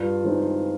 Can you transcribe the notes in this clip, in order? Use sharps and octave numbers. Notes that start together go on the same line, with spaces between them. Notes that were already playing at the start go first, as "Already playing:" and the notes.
Already playing: G2 F4
E3 G#3 C4 D#4